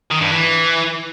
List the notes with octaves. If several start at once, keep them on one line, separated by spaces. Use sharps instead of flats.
D#3
G2
E3